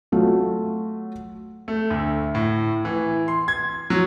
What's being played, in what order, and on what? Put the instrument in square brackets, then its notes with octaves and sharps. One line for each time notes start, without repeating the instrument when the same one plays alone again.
[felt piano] F#3 A3 F4
[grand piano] A3
D2
A2
E3
C6
G#6
F#3